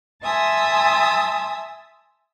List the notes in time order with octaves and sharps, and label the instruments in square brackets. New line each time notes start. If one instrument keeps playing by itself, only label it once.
[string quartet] E5 G#5 A5 C6 D#6 E6